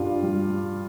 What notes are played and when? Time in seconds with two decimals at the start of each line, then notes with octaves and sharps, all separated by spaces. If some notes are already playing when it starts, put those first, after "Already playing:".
Already playing: G2 G3 F4
0.22 G3